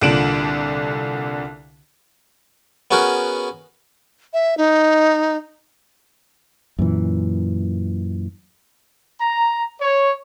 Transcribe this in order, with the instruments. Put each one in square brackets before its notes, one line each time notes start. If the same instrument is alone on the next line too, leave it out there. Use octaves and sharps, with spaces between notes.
[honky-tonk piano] C2 A#2 D3 D7 E7 F#7
[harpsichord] B3 C#4 F#4 G#4 A#4
[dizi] E5
D#4
[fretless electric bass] F#2 A#2 E3
[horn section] A#5
C#5